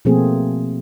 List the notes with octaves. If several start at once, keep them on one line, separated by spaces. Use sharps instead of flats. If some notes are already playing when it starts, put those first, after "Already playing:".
B2 F3 A3 A#3 C4 G#4